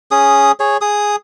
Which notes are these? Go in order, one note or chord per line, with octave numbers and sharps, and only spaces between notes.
C#4 G#4 D#6
G#4 C#5
G#4 D#6